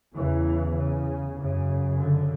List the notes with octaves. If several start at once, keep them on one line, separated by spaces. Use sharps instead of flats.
E2 C#3 E3
C#3
F#2 C#3
D3